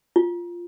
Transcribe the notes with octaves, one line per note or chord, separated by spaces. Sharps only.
F4